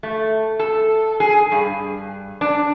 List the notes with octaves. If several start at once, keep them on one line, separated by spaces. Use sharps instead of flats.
A3
A4
G#4
G2
D4